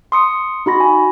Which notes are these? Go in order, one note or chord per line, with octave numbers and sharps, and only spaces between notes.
C6 D#6 C#7
D#4 F#4 B5 A#6
G#5